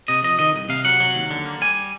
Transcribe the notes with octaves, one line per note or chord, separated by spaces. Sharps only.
C3 D#5
F2 D#5
D#3 D#5
C2
C3 F5
F#3 F#5
F#3
D#2
D3
A#3
G3 G#5